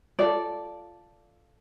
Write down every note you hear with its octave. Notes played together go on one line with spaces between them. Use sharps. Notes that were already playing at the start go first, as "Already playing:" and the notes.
F4 A4 D5